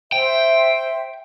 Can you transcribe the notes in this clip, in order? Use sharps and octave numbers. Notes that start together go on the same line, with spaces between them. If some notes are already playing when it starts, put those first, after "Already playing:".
C5 E5 G5